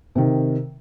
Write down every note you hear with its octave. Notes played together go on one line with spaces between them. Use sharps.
C3 D#3